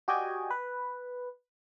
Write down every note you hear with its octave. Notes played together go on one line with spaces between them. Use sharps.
F#4 G4 D5 D#5 G5 G#5
B4